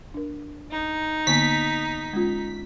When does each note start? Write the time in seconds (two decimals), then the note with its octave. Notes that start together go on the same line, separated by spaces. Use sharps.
0.14 D4 A#4
0.72 D#4
1.27 D3 A#3 B3 B6
2.13 G#3 C#4 F4